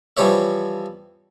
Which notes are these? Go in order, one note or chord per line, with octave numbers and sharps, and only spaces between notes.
E3 F3 G3 C5 C#5 E5